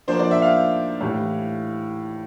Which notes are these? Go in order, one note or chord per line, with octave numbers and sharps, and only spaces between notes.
F3 A#3 D4 C5
D5
E5
F5
A2 E3 G3